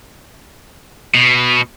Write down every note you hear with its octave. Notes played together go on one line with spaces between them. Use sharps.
B2